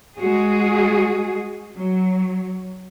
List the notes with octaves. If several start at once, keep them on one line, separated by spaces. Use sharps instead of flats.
G#3 F#4 G#4
F#3